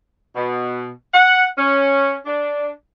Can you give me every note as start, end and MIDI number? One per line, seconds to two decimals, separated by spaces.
0.36 0.89 47
1.13 1.46 78
1.58 2.15 61
2.26 2.69 62